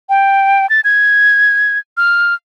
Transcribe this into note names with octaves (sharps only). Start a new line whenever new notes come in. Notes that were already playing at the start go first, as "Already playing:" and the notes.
G5
A6
G#6
F6